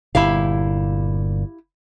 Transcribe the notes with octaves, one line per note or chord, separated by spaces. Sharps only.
G1 A#2 E4 G4 F5